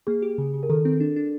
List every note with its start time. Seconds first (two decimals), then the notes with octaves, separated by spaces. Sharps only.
0.07 A#3 G#4
0.22 G4
0.38 C#3
0.54 C#3
0.63 A#4
0.70 D#3 A4
0.85 C4
1.00 D4
1.16 D4